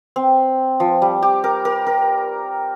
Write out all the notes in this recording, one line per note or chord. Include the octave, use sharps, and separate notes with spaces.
C4
F3
G3
G4
A#4
A#4
A#4